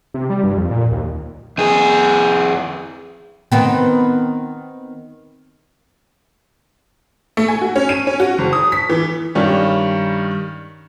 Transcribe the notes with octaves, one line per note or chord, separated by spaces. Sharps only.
C3
G3
G2
F2
A#2
D#2
F2 G#4
D#3 B3 C4
A3
G#5
F#4
C#4
D#7
C#4
F#4
F#1
D#6
B6
E3
G2 D#3 G3 C#4